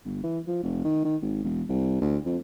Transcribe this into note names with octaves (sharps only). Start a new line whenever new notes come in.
G1
E3
F3
F1
D#3
D#3
G#1
E1
C2
D2
F2